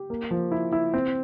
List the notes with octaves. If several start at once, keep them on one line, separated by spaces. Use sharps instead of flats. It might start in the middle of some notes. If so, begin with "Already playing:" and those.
Already playing: G4
A#3
F3
E4
E4
C4